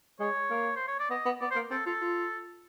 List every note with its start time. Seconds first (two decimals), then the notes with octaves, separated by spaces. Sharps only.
0.20 G#3 C#5
0.51 A#3
0.76 C5
0.88 C#5
0.99 D5
1.10 B3 D#5
1.26 B3
1.41 B3 D5
1.51 C5
1.56 A#3
1.71 C4 A4
1.86 F4 A4
2.01 F4